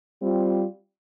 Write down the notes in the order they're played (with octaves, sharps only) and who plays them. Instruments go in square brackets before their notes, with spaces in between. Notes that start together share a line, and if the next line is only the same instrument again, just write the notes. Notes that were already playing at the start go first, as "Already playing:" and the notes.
[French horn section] G3 C4 F4